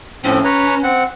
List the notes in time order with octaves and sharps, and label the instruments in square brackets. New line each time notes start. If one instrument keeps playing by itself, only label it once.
[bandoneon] A2 F3 C4 [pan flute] C#4
[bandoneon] B4 C#5 A#5
C4 F#5